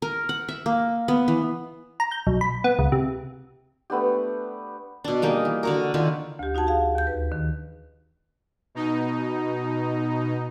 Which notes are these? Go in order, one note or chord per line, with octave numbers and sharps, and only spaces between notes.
A#4
F#5
E5
A#3
B3
E3
A#5
G6
B1
B5
B3
C#2
C3
A3 B3 D4 G4
B2 D4
G3 A#3 D#4 G#4
E3
D3 F#4 A#4
D3 D#3 F4 B4
D2 G4
D#4 F#4 F#5 A5 G#6
G#4 F5
D#2 G6
B4
D#3
B2 D#4